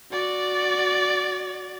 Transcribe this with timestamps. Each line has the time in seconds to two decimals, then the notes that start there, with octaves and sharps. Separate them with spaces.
0.12 F#4 D5